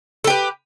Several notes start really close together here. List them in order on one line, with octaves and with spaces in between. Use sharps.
A4 G4 B4